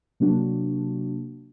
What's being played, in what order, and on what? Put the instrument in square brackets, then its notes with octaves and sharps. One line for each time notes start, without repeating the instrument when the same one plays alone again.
[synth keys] C3 F#3 A#3 D4 F#4